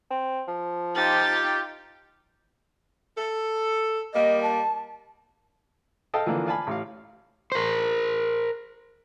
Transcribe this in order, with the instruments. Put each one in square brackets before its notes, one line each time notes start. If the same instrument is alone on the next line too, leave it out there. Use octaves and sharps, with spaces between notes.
[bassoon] C4
F3
[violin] D#4 A6 [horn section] F4 G4
[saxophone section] A4
[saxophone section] G3 A#3 [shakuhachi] D#5
[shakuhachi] A5
[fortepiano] A4 D#5 F5 G5 A5
D3 E3 F3 A#3
D5 F5 G#5 A5 B5
A1 F5
[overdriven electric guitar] A#4 C5